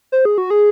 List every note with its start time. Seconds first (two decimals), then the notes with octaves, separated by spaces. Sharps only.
0.12 C5
0.25 G#4
0.38 F#4
0.50 G#4